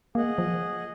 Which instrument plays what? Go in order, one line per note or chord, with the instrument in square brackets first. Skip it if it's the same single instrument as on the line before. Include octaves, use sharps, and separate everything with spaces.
[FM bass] A#3 [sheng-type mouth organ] G#4 D#5 F#5
[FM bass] F3